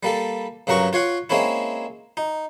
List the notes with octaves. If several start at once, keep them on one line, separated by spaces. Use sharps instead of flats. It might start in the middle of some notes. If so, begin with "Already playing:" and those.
G3 A#3 A4
G2 C#3 F#3 A#4 F#5 C#6
F4 C#5 F5 F#5
G#3 A#3 C4 C#4 E4
D#4